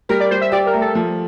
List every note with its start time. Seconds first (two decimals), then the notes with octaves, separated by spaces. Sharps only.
0.09 G3 A#4
0.20 D5
0.30 G3 C5
0.41 E5
0.52 G4 D5
0.66 A#4
0.74 A3
0.81 A4
0.95 F3